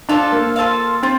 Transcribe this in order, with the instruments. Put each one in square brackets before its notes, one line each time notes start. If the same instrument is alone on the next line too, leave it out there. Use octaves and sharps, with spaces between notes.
[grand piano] D4 [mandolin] F4 A4 C5 F5
[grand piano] A#3
[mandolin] F4 A4 C5 F5
[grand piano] C4 [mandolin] F4